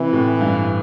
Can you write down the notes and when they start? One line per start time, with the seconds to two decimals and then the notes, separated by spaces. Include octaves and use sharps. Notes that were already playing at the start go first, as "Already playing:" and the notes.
Already playing: C3 E3
0.13 A2
0.41 G2